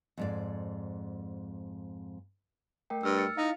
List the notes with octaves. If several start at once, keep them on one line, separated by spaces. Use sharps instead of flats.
F2 G#2 D5
A3 A#4 G5
G2 E6 F6
A6 C#7
D#4 E4 F5